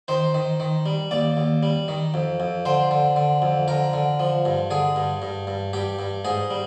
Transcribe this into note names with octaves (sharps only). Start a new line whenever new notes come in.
D#3 C5
D#3
D#3
G3
D#2 D5
D#2
G3
D#3
F2
F2
D3 C5
D3
D3
F2
D3 A#4
D3
F3
G2
D3 G#4
G2
G2
G2
G2 G4
G2
G#2 G#4
G3